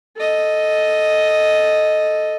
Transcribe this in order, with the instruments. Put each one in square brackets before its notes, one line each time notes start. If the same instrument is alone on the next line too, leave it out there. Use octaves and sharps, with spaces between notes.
[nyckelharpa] A4 D#5